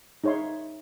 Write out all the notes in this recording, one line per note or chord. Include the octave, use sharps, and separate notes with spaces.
D#4 G#4 C#5 E5 C6